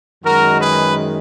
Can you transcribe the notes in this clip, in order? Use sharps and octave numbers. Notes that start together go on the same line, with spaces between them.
F#2 D#3 G#3 F#4 A#4
G#4 B4